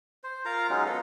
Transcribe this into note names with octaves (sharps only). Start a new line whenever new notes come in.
C5
F4 A#4 F5 A#5
F#3 G#3 C#4 D#4
B3 F4 A4